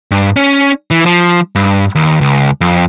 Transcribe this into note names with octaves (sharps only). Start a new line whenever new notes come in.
G2
C#4
E3
F3
G2
D#2
C#2
F2